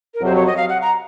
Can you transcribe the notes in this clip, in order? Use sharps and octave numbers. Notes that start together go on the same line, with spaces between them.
A#4
F2 C3 F#3 C5
C#5
D#5
F5
F#5
A#5